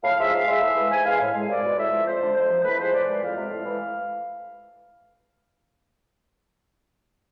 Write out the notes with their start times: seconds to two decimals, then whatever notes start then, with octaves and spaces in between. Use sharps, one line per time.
0.04 A2 F5
0.18 F3 G#3 E5
0.33 G#2 F5
0.48 G#3 E5
0.62 A2
0.77 E3 G#3
0.91 G#2 G#5
1.05 E3 G#3 F5
1.20 A2
1.34 G#3
1.48 C2 D5
1.63 B2 G#3
1.77 A2 E5
1.91 F3 G#3
2.06 F2 C5
2.21 D3 G#3
2.35 F2 C5
2.49 C3 F3
2.64 A2 B4
2.78 F3 G#3 C5
2.93 A2 D5
3.07 E3 G#3
3.21 F2 F5
3.36 C3 G#3
3.51 A2
3.65 E3 G#3